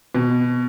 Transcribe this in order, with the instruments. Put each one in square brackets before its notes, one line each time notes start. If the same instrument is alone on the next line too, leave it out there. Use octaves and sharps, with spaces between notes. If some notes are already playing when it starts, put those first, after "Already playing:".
[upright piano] B2